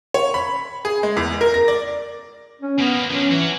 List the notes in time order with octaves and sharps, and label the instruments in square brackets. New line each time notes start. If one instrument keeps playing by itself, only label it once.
[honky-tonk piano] C#5
B5
G#4
G#3
E2
A#4
A#6
D5
[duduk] C#4
[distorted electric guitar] B2 A#3 [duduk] B3
[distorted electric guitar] F3 D4 [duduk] C#4
[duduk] E3 [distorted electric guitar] F#4 C#5